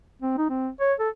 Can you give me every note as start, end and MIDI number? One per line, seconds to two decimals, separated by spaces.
0.22 0.34 60
0.38 0.45 63
0.50 0.69 60
0.80 0.94 73
1.00 1.09 69